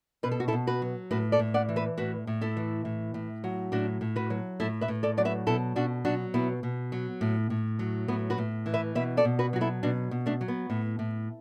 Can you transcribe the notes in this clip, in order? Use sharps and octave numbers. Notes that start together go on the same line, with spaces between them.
B2 B4
A4
F#4
E4 A4
B2
F#4 B4
F#3
A2 F#4 B4
A4 D5
A2
D5 F#5
E3
B4 E5
A2 F#4 B4
A2
E4 A4
E3
A2
A2
F#3
A2 D4 F#4
A2
F#4 B4
F#3
A2 E4 A4
B4 E5
A2
A4 D5
F#3 D5
B4 E5
B2 E4 A4
B2 D4 F#4
F#3 D4 F#4
B2 B3 E4
B2
F#3
A2
A2
F#3
A2 B3
F#4 B4
A2
E3
B4 E5
B2 B4 E5
A4 D5
B2
F#4 B4
F#3 F#4
E4 A4
B2 D4 F#4
B2
A3 D4
F#3
B3
A2
A2